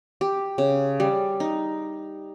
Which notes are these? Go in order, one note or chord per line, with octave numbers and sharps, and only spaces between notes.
G4
C#3
G3
D#4